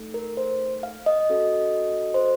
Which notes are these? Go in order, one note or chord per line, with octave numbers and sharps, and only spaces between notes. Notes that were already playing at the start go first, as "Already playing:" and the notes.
Already playing: A3 D#4 A4
A#4
C5
F5
D#5
C#4 F#4 A4
C5